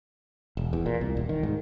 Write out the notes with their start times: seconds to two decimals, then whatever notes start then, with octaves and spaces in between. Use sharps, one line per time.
0.57 E1
0.73 E2
0.86 A#2
1.01 C2
1.17 E1
1.29 D#3
1.43 G#2